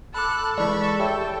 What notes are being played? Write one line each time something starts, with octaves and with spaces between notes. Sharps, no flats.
A4 A5 B5 D6 F#6
E3 G#3 D5 B5 C#6
G4 C#5 E5 G5